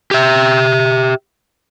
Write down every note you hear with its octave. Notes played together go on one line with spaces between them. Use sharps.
G4 E5